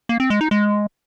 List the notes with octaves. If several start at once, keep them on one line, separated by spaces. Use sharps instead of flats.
A#3
C4
G#3
D#4
G#3